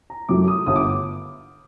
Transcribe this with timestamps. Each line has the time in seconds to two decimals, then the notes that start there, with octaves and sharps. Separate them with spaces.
0.10 A#5
0.29 F#2 F#3 A3 D6
0.48 D#6
0.66 G1 G2 D3 D#6
0.76 D6